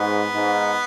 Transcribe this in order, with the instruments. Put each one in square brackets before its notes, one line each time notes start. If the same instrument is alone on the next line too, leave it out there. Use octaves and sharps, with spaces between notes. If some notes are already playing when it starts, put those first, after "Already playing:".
Already playing: [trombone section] G#2 [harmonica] B3
[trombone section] G#2